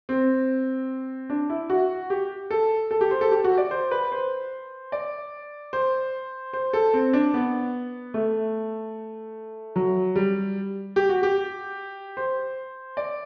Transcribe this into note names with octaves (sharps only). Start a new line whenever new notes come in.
C4
D4
E4
F#4
G4
A4
A4
G4
C5
A4
G4
F#4
D5
C5
B4
C5
D5
C5
C5
A4
C4
D4
B3
A3
F#3
G3
G4
F#4
G4
C5
D5